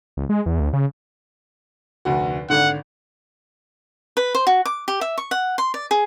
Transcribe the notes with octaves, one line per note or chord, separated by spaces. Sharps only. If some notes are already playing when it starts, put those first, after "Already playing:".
C#2
G#3
E2
D2
C#3
F1 D2 F#4
G#1 D3 F#5
B4
C5
F#4
D6
G4
E5
C#6
F#5
C6
D5
G#4